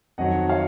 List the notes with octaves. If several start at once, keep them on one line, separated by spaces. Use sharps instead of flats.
F2 D#3 F#3 D#5 F#5
C#5 F5